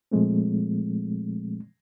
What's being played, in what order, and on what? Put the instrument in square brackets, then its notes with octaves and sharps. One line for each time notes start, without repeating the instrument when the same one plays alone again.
[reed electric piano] A#2 F3 G#3 A3 C4